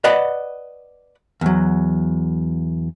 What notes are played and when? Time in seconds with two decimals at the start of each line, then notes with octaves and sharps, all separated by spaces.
0.04 B4 D5 D#5 F#5 B5
1.41 E2 F#3